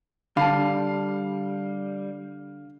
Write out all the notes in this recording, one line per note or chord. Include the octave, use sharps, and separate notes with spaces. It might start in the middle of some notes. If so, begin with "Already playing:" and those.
D3 G3 F5 A5 B5 C7